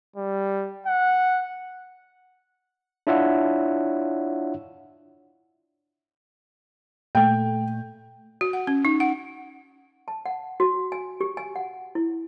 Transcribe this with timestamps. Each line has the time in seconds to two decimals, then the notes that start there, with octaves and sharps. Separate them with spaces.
0.16 G3
0.86 F#5
3.07 D4 E4 F4 C#5 E5 F#5
7.15 A#2 A3 G5
8.41 F#4
8.53 F#5
8.67 C#4
8.85 D#4
9.00 F#5
10.08 A5
10.26 F#5
10.60 F#4
10.92 G#5
11.21 G4
11.37 G#5
11.56 F#5
11.95 E4